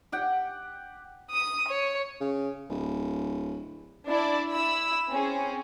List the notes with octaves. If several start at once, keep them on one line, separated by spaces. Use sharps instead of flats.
G4 F#5 G5
D#6 D#7
C#5
C#3
D1
D4 E4 D5
E4 B5 E6
C4 C#4 G#4